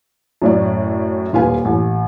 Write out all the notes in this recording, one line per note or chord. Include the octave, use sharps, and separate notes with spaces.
F#2 A2 D5
D#1 F4 G4 B4 G#5
A1